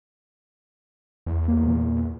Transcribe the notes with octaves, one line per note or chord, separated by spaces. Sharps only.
E2
A#3
A#2